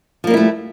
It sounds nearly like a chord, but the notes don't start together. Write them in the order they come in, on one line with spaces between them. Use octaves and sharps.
F3 A#3 G3 E4 A3